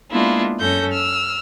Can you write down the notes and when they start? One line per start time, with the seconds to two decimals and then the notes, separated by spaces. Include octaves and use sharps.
0.10 G#3 A#3 B3 D4 E4 F4
0.59 F#2 C#4 A4 G6 A#6
0.91 E6 F6